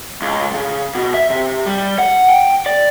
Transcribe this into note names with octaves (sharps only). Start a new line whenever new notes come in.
C#2
C#3
B2
E5
C3
G3
F#5
G5
D5